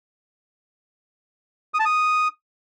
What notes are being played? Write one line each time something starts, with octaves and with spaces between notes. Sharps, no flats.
D#6
A5
D#6